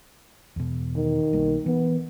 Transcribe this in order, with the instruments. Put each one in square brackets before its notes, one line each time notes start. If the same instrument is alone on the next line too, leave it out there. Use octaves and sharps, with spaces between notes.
[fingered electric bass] E2 B2
[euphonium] D#3
[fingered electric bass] B1 G3 A#3
[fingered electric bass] E3 [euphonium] B3